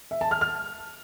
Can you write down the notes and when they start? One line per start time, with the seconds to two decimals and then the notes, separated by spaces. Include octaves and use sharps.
0.11 E5
0.21 A5
0.31 F6
0.41 F6